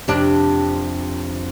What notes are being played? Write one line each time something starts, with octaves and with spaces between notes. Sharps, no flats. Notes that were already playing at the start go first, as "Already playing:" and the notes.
F2 C3 D4